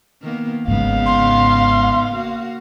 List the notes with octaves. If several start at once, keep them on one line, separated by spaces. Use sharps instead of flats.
D#3 A#3 B3
G#1 G#2 C#3 B3 D#4 F5
C6
A#3 F#4